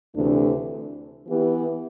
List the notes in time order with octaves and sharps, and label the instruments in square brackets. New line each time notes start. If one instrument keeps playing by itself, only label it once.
[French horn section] D2 C3 E3 A3 D4
E3 B3 E4 G4 B4